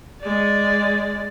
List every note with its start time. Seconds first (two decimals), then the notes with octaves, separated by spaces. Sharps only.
0.21 G#3 D5